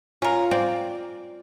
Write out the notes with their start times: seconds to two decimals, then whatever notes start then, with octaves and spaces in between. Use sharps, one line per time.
0.22 C#4 F4 A#4
0.51 C4 D5